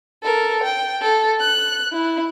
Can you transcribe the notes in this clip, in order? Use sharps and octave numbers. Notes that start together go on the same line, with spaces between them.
A4 A#4
G5
A4
F#6
E4